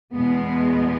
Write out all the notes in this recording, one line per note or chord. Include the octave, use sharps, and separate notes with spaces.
E2 B2 G#3 B3